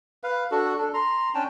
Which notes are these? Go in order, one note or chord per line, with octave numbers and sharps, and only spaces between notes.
B4 F5
D4 F#4 A4
D4 A4
A#5 C6
C#4 D4 G5 A5